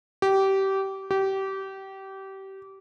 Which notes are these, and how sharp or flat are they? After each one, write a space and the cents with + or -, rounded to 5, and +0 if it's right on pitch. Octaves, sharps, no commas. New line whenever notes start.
G4 -20
G4 -25